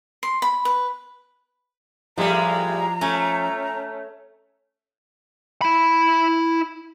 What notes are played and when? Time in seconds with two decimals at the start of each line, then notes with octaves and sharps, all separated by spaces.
0.23 C6
0.42 B5
0.65 B4
2.17 A2 F3 G3 G#3 F4 A#5
3.01 A3 C#4
5.62 E4 B5